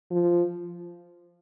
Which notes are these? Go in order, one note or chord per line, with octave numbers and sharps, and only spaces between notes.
F3